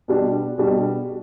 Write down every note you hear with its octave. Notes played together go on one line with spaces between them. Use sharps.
B2 G3 D4
B2 G3 D4